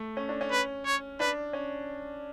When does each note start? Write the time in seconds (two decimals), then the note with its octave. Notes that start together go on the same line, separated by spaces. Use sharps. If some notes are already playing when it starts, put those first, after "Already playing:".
Already playing: A3
0.17 C#4
0.29 D4
0.41 C#4
0.52 B4
0.86 C#5
1.20 D4 B4
1.53 C#4